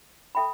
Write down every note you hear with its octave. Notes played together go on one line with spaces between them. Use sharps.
A4 E5 G5 B5